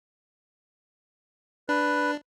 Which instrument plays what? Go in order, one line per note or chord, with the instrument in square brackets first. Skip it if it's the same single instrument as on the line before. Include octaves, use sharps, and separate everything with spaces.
[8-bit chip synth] D4 [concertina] B4